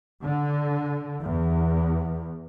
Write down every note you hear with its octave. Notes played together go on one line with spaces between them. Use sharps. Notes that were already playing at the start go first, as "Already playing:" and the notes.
D3
E2